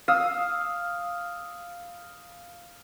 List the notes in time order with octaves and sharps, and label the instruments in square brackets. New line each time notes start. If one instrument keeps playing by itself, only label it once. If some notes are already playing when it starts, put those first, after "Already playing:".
[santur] F5 D#6 E6